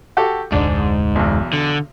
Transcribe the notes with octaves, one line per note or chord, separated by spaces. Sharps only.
F#4 G4 A4
F1 D2 G#2 G#3 D4
B1 E2
D3